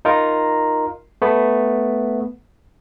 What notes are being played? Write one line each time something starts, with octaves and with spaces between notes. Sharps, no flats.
D#4 F4 A#4
A3 B3